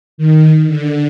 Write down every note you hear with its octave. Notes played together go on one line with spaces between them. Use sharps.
D#3
D3